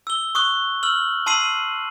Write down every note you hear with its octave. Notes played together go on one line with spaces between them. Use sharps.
E6 G7
C#6 D#6 F#6 G7
E6 F6 F#7
A5 C6 E6 C7 D#7 F#7